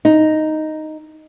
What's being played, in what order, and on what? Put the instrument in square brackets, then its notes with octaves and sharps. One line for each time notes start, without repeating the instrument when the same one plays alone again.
[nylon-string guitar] D#4